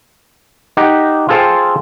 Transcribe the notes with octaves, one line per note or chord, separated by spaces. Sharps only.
D#4 G4 F#5
F4 G#4 A4 C5 F5 G5